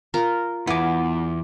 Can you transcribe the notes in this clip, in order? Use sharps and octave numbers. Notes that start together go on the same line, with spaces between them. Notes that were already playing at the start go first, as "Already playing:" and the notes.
F4 A#4 A#5
E2 B3 E4 G#5 D6